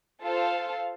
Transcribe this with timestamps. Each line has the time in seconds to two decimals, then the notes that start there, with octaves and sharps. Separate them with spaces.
0.22 F4 A4 C5 F5 A5